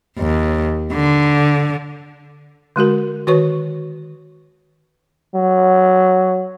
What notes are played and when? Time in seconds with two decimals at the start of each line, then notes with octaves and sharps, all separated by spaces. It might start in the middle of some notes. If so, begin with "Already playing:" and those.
0.19 D#2
0.92 D3
2.76 D3 G#3 F#4 A#4
3.27 D#3 F#4 B4 C#5 C#6
5.35 F#3